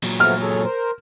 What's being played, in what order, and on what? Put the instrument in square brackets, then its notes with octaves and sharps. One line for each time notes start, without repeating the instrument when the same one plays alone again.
[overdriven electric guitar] A#2 F#3
[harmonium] F3 A3 B3 [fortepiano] F6
[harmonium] G#4 A4 C#5
A#4 C5